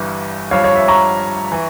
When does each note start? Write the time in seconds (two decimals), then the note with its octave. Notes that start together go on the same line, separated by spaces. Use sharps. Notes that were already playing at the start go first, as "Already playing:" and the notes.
Already playing: G1 G2 E3
0.51 G#1 G2 F3 C#5 F5
0.64 C#5
0.76 E5
0.88 A#5 C#6
1.52 E3